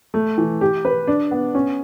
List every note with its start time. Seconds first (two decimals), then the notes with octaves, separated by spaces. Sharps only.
0.14 A3
0.38 E3
0.61 G4
0.85 B4
1.07 D4
1.31 B3
1.55 C#4